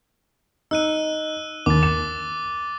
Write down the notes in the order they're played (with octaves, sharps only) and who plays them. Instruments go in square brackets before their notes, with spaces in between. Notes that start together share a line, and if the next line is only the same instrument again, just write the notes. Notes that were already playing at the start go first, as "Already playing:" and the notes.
[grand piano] D#4 [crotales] E6 F#6 D#7
[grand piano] D#2 [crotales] D6 A6
[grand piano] E7